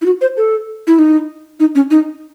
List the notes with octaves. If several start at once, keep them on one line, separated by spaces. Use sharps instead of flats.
E4
F#4
C5
A4
E4
D#4
D#4
C#4
D#4